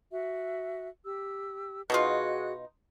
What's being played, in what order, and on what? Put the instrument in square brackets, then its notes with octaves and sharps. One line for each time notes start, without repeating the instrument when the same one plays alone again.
[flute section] F#4 E5
G4 E6
[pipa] B2 D#4 F4 [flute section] F#4 G#4 F#6